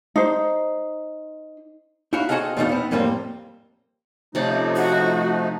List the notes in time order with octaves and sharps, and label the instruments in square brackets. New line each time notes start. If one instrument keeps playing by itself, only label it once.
[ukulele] D#4 C5
[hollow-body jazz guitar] D#4 E4 F#4 F5
C4 F#4 G#4 A4 D#5 F5
E2 B2 G3 A3 D#4 F5
B3 C4
F2 A2 G3 A#3 C4
[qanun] C3 C#4 D5 [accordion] F3 A3 D#4
[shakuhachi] F#4